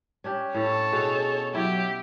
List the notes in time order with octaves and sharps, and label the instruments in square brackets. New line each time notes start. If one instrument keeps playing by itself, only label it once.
[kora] C#4 D4 G4
[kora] A2 [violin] A4 C#5
[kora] B2 [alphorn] G#4
[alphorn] F#3 [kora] E4 [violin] G4